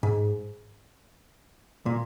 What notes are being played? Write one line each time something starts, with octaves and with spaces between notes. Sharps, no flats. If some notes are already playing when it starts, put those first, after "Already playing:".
G#2
A#2